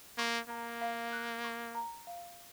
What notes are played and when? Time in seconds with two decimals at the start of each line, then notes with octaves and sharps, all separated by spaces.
0.18 A#3 C#6
0.49 A#3 A#5
0.81 F5
1.13 F#6
1.44 C#6
1.75 A#5
2.07 F5